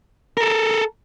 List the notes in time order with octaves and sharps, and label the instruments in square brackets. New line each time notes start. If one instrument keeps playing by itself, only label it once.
[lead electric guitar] A4 A#4